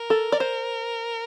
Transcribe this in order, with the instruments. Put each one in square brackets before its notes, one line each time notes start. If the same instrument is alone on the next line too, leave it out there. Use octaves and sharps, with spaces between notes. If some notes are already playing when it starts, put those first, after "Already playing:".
Already playing: [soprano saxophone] A#4
[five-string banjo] A4
D5
C5